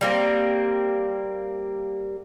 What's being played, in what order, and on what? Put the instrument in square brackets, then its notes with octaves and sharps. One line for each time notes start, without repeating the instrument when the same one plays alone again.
[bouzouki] G3 A#3 C4